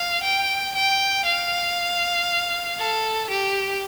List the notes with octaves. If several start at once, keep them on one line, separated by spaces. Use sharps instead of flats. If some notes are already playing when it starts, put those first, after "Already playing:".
Already playing: F5
G5
G5
F5
A4
G4